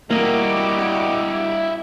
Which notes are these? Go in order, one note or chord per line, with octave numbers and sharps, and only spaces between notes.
G3 A#3 E4 F#4 G4 D#5 D6